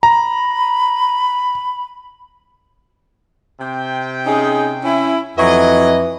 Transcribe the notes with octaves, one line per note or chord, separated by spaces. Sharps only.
A#5 B5
C3 G5
C#4 D#4 G#4
C#4 E4
F2 E3 F#3 F#4 D#5